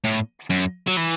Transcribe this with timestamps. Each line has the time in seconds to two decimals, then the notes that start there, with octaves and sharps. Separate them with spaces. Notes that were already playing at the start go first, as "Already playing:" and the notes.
0.04 A2
0.50 F#2
0.87 F#3
0.97 E3